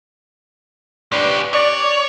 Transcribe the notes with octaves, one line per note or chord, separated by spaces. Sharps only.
C#4 D4 G4 B4 C5
C#5 D5